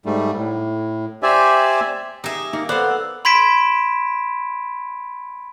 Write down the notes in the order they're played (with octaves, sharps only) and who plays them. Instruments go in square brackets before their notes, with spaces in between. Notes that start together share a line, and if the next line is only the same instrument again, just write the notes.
[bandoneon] G#2 G3 A3
A2
G4 C5 D5 E5 G#5
[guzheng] D#4 G#4 [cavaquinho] G4 E5
[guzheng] A#3 [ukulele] D#4
[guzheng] B3 F5 [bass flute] A4 [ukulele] C5 D5 [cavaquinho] F#5
[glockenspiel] B5 C6 G#6 B6 D7 E7